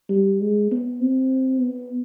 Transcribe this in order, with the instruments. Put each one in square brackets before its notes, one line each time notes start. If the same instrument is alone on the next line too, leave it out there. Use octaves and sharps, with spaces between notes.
[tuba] G3
G#3
B3
C4
B3